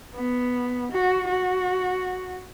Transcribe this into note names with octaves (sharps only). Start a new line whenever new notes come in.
B3
F#4
F#4